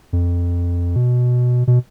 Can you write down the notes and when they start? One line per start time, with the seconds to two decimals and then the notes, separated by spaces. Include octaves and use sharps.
0.13 F2
0.96 B2
1.67 B2